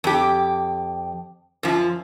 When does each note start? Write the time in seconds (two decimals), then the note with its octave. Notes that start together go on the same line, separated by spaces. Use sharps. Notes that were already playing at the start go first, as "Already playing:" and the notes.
0.04 F2 G4
1.63 F#2 F3